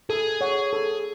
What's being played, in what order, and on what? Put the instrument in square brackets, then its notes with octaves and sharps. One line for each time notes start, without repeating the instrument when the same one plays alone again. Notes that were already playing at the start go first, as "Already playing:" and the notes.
[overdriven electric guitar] G#4 [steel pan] A4
[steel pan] C#5 F#5
A4